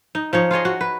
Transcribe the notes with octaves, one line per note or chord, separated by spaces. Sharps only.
D#4
F3 D#4 C#5
F4 G#4 C#5 D#5
F#4
B4